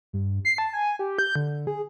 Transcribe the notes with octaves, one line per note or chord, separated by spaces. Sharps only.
G2
C7
A5
G#5
G4
G6
D3
G#4